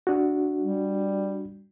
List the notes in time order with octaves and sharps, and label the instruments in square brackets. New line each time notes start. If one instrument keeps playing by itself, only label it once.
[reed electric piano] D4 F#4
[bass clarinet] G3